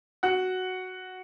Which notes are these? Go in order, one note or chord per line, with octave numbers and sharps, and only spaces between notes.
F#4 F#5